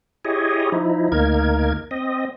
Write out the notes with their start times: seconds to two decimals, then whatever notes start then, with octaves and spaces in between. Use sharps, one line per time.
0.25 E4 G4 G#4 C#5 D#5
0.72 F3 D#4 E4
1.12 D2 A#3 D#4 A#4 G#6
1.91 C4 D#5